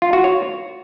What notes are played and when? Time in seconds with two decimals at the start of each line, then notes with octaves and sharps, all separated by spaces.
0.02 F4
0.13 F#4
0.24 C#5